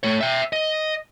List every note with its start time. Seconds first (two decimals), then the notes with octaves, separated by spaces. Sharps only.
0.03 A3 C#5
0.21 E5 G5
0.53 D#5